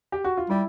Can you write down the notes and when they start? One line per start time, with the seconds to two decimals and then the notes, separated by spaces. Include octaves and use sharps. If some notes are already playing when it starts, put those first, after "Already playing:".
0.12 G4
0.24 F#4
0.37 F4
0.50 G3 E4